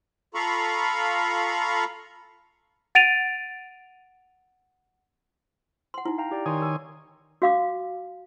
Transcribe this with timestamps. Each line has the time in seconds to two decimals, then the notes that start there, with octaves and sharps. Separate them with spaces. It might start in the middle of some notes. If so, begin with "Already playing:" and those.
0.35 F4 A4 F5 A#5 B5 C#6
2.95 F#5 A6 D7 D#7 F7
5.94 F#5 C6
6.05 D#4 E4
6.18 F5 G5 A#5
6.31 G4 D5 G5
6.46 D#3 C#5 G#5 C6 D#6
6.62 A#4
7.42 F#4 F5 D6